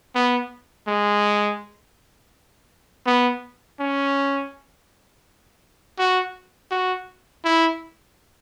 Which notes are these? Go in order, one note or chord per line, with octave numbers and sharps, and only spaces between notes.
B3
G#3
B3
C#4
F#4
F#4
E4